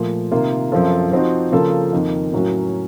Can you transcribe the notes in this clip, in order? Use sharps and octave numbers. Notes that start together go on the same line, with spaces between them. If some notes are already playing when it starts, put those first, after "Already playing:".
Already playing: A#2 F3 A3
C3 D#3 A#3 F4
F#2 F3 C4 F4 A4
F3 C4 D#4 F#4
C#3 F3 A#3 F4 A4
F2 D#3 A#3 D#4
A2 F#3 A#3 C#4 F#4